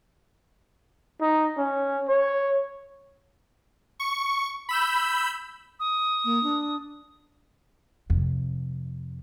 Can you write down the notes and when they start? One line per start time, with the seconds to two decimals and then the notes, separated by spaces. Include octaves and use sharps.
1.21 D#4
1.58 C#4
2.09 C#5
4.00 C#6
4.69 B5 E6 G6
5.80 D#6
6.25 A#3
6.43 D4
8.10 F2 C3